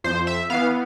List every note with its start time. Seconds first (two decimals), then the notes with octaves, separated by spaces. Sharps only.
0.04 F2 C5
0.27 E5
0.50 E3 B3 F5